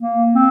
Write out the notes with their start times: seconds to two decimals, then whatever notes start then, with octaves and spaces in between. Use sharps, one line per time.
0.01 A#3
0.35 C4